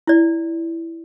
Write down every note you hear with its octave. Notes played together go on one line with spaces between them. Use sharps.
E4 D5